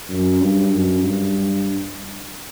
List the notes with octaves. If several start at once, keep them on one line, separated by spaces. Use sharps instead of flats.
F#2
G2
F#2
G2